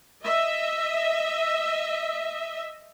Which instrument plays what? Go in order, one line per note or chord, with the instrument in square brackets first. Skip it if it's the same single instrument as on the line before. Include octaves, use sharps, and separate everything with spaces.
[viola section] D#5 E5